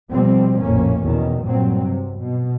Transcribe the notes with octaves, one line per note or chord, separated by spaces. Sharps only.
B2 F3 G3 C4
F1 A#1 F2 A2 A#3 C#4
E2 B2 D#3
G2 A#2 F#3 C4
C3
B2